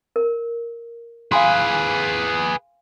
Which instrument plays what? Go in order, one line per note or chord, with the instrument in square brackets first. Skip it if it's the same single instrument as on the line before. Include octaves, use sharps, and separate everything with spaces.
[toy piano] A#4
[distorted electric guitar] G#4 B4 [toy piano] F5 G#5 C6